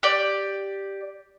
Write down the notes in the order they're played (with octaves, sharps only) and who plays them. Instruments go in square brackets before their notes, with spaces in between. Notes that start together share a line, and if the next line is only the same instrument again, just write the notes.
[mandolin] G4 D5